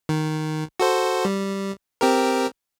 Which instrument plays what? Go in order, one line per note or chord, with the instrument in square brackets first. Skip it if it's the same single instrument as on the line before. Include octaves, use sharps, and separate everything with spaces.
[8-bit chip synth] D#3
F#4 A4 C5
G3
C4 G4 A#4